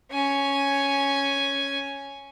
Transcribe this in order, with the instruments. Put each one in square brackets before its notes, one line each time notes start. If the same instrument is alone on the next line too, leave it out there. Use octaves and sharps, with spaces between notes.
[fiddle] C#4 G#5